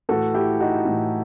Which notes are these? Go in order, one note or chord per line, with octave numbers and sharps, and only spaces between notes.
A2 E3 F#4 A4
E4 G4
D#4 F#4
A2 E3